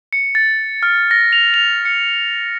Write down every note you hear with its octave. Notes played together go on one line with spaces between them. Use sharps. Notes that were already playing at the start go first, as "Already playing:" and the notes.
C#7
A6
F6
A#6
F7
F7
C#7